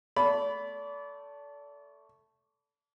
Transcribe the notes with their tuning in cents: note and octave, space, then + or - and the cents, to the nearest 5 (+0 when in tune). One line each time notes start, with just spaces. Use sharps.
A3 +0 D5 -35 B5 +0